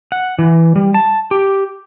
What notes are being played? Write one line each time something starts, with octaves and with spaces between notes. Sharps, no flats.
F#5
E3
G3
A5
G4